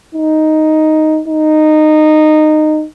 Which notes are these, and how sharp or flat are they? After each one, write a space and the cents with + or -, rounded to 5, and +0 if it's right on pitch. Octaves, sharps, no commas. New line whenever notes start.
D#4 +5
D#4 -15